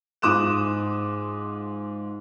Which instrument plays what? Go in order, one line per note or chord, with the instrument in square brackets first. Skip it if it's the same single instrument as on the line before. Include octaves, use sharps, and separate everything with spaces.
[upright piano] G#2 F4 D6 D#6 F#6 E7